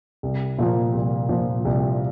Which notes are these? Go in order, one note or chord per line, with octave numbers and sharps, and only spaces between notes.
C2
A#2 F3 A#3
C2
A#2 F3 A#3
C2